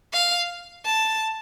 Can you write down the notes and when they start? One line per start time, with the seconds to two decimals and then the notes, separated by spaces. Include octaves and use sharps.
0.13 F5
0.86 A5